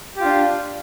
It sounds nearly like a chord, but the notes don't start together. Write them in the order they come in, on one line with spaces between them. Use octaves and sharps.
G4 F4 D4